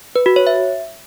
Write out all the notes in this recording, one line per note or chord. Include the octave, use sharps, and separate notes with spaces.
B4
F#4
C#5
E5